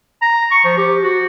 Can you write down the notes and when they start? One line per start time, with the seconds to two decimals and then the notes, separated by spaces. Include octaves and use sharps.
0.22 A#5
0.51 C#6
0.64 F3
0.77 G4
1.03 F#4